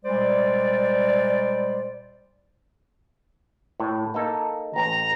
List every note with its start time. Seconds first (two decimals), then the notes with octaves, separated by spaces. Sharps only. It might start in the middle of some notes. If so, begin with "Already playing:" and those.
0.04 A#2 G3 G#3 C5 D5
3.80 A2
4.14 A#3 D#4 A4
4.76 A1 A#5